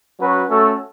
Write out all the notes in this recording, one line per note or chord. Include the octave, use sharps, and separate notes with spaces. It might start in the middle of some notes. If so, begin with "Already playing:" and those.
F#3 C#4 F#4 B4
A3 C#4 F#4 A4